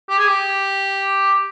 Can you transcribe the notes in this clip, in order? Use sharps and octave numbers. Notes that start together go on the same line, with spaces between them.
G4
G#4
G4